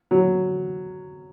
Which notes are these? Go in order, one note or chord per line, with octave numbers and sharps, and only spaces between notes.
F#3